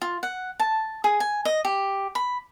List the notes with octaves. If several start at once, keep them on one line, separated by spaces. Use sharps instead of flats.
F4
F#5
A5
G#4
G#5
D#5
G4
B5